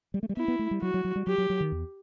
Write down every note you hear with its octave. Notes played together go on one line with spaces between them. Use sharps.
G3
A3
G3
B3 E4
B3
A3
G3
F#3 F#4
F#3
F#3
G3
F#3 G4
F#3
F#3
D#3
E2